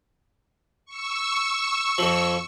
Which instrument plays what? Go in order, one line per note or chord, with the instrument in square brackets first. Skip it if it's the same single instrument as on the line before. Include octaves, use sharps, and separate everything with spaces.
[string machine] C#6 E6
[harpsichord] F2 F3